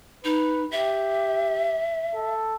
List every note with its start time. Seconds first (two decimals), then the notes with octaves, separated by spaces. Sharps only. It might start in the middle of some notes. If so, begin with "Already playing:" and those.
0.25 D#4 B4
0.71 G4 E5
2.15 A4